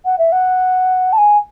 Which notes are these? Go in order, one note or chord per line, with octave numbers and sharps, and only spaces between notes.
F#5
E5
F#5
A5
G#5